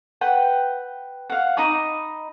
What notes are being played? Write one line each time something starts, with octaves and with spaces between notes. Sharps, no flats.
B4 F#5 G5
F5 F#5
D#4 D#5 B5 D6